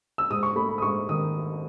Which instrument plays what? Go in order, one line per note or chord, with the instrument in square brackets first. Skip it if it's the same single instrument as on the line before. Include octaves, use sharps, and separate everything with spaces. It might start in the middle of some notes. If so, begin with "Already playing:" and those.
[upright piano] E6
G#2 D#6
C#6
A3 B5
B5
D#6
G#2 C#6
D#3 D#6